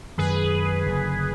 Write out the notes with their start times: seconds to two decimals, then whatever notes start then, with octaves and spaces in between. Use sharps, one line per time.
0.18 F#2 D#3 G#3 G#4 B4
0.86 F#1 F#2 D3